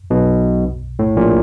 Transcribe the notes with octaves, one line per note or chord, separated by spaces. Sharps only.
B1 B2
A2
A#1 A#2